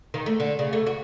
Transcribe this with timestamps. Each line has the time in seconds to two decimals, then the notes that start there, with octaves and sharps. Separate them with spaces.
0.14 D#3
0.26 A3
0.40 D3
0.59 C#3
0.73 A3
0.87 F#4